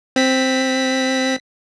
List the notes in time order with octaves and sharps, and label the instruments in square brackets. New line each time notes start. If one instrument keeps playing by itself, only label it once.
[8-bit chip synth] C4 B6